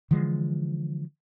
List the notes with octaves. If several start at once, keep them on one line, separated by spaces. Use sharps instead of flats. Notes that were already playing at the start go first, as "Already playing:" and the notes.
D3 E3 F3 G#3